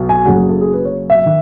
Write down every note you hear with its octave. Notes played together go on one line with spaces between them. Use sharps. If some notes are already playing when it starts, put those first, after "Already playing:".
Already playing: B1 B2
G#5
F#1 F#2 C#3 F#3 F#5
G#4
A4
G#4
B4
C#5
E5
D#3